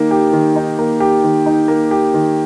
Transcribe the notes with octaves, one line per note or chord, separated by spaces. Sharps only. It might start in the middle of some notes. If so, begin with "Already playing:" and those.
Already playing: D#3 A#3 D#4 G4
G4
D#3
D#4
A#3
G4
D#3
D#4
A#3
G4
D#3